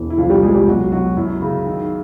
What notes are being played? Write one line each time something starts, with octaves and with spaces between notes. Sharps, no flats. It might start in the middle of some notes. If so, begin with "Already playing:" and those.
Already playing: E1 E3
E4
C2 F3 F4
G3 G4
C2 G#3 G#4
G3 G4
B1 F#3 F#4
B1 F#3 F#4
F#2 E4
C#3
D#3